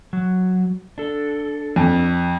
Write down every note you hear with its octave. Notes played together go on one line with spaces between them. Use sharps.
F#3
D4 A4
F2